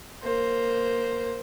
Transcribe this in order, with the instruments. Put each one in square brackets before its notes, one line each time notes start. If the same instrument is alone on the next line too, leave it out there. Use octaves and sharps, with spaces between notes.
[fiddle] A#3 C5